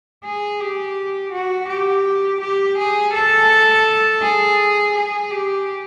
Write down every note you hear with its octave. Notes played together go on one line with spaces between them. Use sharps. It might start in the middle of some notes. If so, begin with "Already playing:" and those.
G#4
G4
F#4
G4
G4
G#4
A4
G#4
G#4
G4